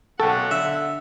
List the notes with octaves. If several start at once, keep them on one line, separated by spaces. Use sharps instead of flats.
B1 A4 F#5 G5 C#6
D3 E5